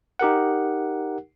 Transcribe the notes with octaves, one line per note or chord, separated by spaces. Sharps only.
D#4 G4 A#4 F#5